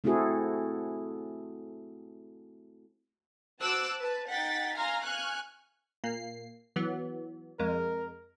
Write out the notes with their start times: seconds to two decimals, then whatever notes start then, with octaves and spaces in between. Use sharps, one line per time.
0.04 A3 C4 E4 F#4 G#4 A4
3.61 F#4 C5 A5 D6 E6 F#6
4.01 B4 A5
4.30 D#4 F#5 G5 A6 B6
4.75 F5 G#5 A#5 C6 F6
5.04 G#5 C#6 F6 F#6
6.04 A#2 A#3 C7
6.76 E3 F#3 B3
7.59 F2 G#3 A#4